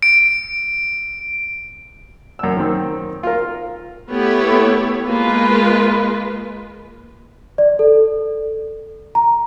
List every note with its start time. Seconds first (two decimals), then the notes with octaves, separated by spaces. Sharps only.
0.03 D7
2.39 F#2 E6
2.57 D#3 C4
3.23 F4 A#4
4.10 A3 B3 E4 G4 A4 C#5
5.06 G#3 A#3 F4 B4
7.58 D5
7.79 A4
9.15 A#5